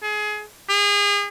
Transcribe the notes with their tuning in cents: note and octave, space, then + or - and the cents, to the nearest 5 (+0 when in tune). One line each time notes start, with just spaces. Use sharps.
G#4 +25
G#4 -35